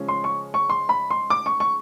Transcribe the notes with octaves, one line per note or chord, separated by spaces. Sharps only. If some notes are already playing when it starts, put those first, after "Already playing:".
Already playing: C#3 F3 G#3 C#4
C6
C#6
C#6
C6
B5
C6
D6
C#6
C#6